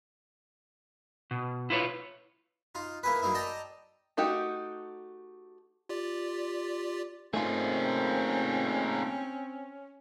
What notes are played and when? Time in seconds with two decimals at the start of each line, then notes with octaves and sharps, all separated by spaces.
1.31 B2
1.70 E4 F4 B4 C#5
2.75 D#4 F4
3.03 A#3 E4 G#4 B4
3.22 F#3 A#3 D#4 E4
3.34 A4 D5 D#5 G5 A5 A#5
4.17 A3 D#4 F#4 G4
5.89 F4 G4 D5
7.34 A3 A#3 C4 C#4 D#4 F4 G#4